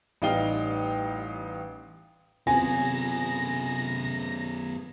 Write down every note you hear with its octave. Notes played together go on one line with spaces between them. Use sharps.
A1 G3 D#4 F5 G5 G7
F#2 C3 B3 F4 G#5 A#6